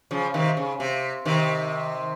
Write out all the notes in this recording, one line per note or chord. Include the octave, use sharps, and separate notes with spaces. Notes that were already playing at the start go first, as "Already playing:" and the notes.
C#3 F3
C3 D#3
C#3
C3
C3 D#3